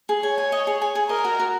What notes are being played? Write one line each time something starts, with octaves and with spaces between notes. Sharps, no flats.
G#4
C#5 G#5
G#5
D#5
G#4
G#5
G#4
A#4 D#5
F#4
F#4